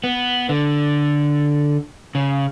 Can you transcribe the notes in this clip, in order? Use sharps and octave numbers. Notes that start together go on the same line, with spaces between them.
B3
D3
C#3